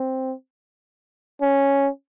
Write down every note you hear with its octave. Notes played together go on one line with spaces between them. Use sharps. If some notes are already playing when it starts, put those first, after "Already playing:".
Already playing: C4
C#4